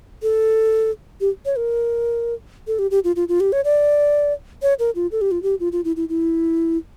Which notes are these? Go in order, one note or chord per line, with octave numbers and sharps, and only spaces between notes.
A4
G4
C#5
A#4
A4
G4
G4
F4
F4
F4
G4
C#5
D5
C#5
A#4
F4
A4
G4
F4
G4
F4
F4
E4
E4
E4